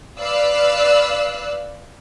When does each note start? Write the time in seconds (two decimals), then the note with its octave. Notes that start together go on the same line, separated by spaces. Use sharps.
0.19 B4 D5 F5 E6 F#6